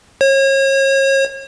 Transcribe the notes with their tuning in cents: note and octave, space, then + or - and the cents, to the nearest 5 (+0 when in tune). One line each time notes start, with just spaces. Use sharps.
C#5 -35